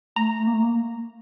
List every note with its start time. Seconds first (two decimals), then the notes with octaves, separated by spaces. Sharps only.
0.16 A3 A#5
0.39 A3
0.47 A#3
0.53 A3
0.62 A#3